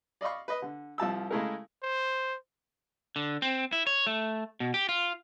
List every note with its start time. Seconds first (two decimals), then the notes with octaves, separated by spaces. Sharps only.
0.21 D5 D#5 F5 B5 C#6
0.48 B4 D#5
0.62 D3
0.98 C2 F3 A5 E6
1.31 C#3 G#3 A3 E4 G#4 A#4
1.83 C5
3.16 D3
3.42 C4
3.73 E4
3.87 C#5
4.07 A3
4.60 B2
4.74 G4
4.89 F4